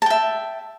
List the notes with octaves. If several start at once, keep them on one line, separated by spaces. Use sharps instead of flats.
E5 G5 A5